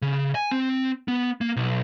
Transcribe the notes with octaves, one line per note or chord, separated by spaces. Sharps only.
C#3
G#5
C4
B3
A#3
B1